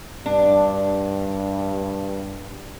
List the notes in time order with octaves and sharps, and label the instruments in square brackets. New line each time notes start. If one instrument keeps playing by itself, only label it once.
[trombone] G2 [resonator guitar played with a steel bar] D4